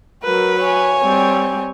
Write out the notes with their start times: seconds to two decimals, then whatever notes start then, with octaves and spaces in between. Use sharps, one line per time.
0.24 F#3 A#4 B4
0.60 C#5 G#5
1.03 G3 C4